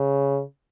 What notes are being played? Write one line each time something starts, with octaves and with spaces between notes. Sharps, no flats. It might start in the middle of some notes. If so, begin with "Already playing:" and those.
Already playing: C#3